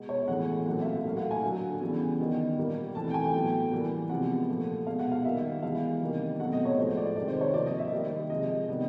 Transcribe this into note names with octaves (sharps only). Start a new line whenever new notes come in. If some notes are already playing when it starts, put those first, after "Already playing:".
Already playing: B2 G#3 B3
C#5
A2 E3 G#3 B3 F#5
A#2 F#3 A3 C4 F#5
E5
F5
A2 F#3 A#3 F5
F#5
G#5
D3 F#3 A#3
C#3 E3 G3 B3
D#3 G3 B3
A#2 G3 A#3
E3 A3 C4 A5
G5
G#5
A2 F#3 B3 G5
E3 G3 A#3
C3 F3 G#3 B3 F#5
A#2 F3 A3
B2 G#3 B3 F5
F#5
F5
D#3 G3 A#3 E5
E3 G#3 B3 F5
C3 D#3 G3 A#3
B2 F#3 A3 C4 F#5
D#5
C#5
A2 F3 G#3 C5
D5
C3 D#3 G#3 D5
C5
C#5
C3 F3 A#3 D5
D#5
E5
D#3 G3 A#3
C3 F3 G#3 D#5
C3 D#3 G3 B3